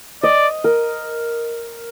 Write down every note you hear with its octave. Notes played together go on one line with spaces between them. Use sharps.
D5 D#5
A#4